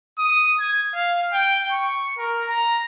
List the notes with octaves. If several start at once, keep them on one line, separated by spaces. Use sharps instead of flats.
D#6
G#6
F5
G5
C#6
A#4
A#5